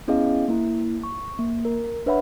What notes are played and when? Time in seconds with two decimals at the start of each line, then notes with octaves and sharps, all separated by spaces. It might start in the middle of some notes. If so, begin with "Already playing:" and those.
0.08 B3 C#4 E4 G#4 D#5 F5
0.48 A#3 E4
1.04 C#6
1.39 A#3
1.65 A#4
2.06 D4 B4 C#5 E5 F#5 B5